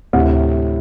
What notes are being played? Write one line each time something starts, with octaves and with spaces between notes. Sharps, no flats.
D2 A2 C3